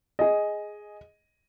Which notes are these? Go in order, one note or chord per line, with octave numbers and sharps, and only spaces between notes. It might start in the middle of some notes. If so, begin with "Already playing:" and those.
G#4 D#5